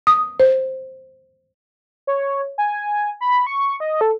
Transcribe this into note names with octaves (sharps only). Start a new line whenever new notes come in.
D#6
C5
C#5
G#5
B5
C#6
D#5
A4